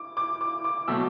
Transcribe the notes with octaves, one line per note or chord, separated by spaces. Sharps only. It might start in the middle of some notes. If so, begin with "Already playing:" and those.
Already playing: D6
D6
D6
D6
B2 F#3 A3 E6